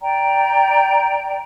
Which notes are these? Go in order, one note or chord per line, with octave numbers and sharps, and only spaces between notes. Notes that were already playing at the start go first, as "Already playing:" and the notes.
D5 G5 A#5